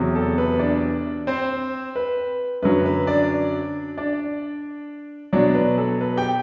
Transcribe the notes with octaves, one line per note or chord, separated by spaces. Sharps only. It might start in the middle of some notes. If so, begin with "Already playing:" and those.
Already playing: E2 C3 F#3
A4
B4
D4 D5
C4 C5
B4
F#2 D3 F#3 B4
B4
D4 D5
D4 D5
B2 F#3 D4 D5
B4
A4
B4
G4 G5